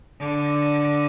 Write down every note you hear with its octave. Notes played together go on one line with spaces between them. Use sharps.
D3